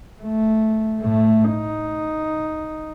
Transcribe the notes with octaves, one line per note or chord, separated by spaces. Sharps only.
A3
A2 A3
D#4